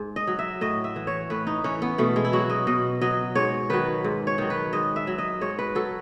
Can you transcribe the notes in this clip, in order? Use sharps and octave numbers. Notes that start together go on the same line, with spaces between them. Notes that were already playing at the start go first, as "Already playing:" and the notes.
Already playing: G#2
D#5
F#3
E5
A2 D#5
E5
E3
C#5
A2 B4
D#4
E3 C#4
B3
B2 A3
G#3
E4
F#3 F#4
D#5
B2 D#5
F#3 D#5
G#2 C#5
D#3 F#3 B4
G#2
C#5
D#3 F#3
B4
G#2 D#5
E5
F#3
D#5
G#2 C#5
B4
F#3 A4